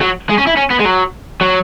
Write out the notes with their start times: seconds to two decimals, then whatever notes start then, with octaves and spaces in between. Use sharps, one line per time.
0.01 F#3
0.29 G#3
0.38 C#4
0.47 E4
0.57 C#4
0.70 B3
0.79 G#3
0.85 F#3
1.41 F#3